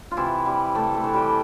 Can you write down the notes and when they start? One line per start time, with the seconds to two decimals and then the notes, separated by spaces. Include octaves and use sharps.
0.11 F4
0.17 C3 E3 E4
0.46 G3
0.75 C3 A3 A4
0.94 A3 A4
1.04 E3
1.14 G3 G4